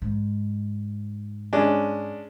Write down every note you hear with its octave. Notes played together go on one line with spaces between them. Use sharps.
G#2
G#3 C#4 D4